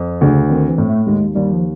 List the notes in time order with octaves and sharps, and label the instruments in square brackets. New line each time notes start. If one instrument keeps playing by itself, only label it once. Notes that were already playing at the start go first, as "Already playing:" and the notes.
Already playing: [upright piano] F2
[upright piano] D2 [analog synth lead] C#3
[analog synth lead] D#3 [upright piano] C4
[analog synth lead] E3
[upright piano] A2
[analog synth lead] A3
[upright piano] D#2 [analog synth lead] G#3
[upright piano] D#2 [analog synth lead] G3
[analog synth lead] F3